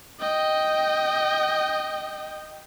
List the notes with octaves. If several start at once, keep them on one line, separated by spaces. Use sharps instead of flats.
D#5 G5